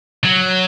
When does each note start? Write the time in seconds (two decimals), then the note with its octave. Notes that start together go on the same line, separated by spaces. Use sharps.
0.24 F#3